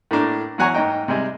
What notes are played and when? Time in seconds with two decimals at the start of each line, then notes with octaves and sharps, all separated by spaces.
0.11 A2 A3 A#3 D4
0.58 E2 F#3 F#5 G#5 A#5 C#6
0.75 G#2 A#3 D#5 G5
1.08 C3 G3 G#3